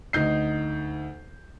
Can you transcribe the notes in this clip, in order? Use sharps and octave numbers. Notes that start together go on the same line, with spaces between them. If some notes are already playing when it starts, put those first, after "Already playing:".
D2 D#4 G6 C7